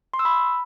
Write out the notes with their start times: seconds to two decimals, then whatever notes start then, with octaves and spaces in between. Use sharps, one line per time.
0.14 C6
0.19 E6
0.25 B5